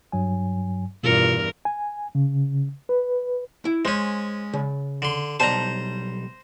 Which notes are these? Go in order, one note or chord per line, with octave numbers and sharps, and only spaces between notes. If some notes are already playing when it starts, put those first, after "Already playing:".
G2 F#3 G#5
E2 G2 B2 F4 A#4 C#7
G#5
C#3
B4
E4
G#3 C#4 C5
C#3
D3 C6
B1 G3 C5 A5 A#5